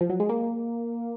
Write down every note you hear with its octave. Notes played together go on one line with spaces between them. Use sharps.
F3
F#3
G#3
A#3